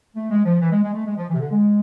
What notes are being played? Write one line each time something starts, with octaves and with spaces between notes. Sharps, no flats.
A3
G#3
F3
E3
G#3
G#3
A3
G#3
F3
E3
C3
D3
G#3